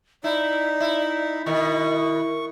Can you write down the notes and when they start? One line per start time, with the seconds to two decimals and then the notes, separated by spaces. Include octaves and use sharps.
0.24 D#4 E4 D5
0.80 E4
1.46 B2 D#3 E4 A#4 C#6